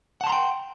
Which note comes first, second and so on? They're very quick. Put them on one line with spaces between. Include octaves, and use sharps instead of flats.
F#5 A5 C6 A#5 G5